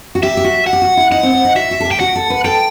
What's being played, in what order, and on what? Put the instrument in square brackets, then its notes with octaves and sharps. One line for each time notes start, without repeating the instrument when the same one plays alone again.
[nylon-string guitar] F#4
[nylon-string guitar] G4 [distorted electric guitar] E5
[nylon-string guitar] G4
F#4
[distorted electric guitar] F#5
[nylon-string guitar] G4
F#4
E4
[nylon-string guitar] D#4 [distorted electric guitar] F#5
[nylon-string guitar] C4
C4
D#4
[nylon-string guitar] F#4 [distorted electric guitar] E5
[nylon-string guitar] F#4
A4
G4
[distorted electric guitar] G5
[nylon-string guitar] F#4 [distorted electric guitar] F#5
[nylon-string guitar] A4
B4
[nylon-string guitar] A4 [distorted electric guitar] G5